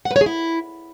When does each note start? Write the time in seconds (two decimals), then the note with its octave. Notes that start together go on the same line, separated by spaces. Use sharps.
0.05 F#5
0.11 B4
0.16 C#5
0.21 G#4
0.26 E4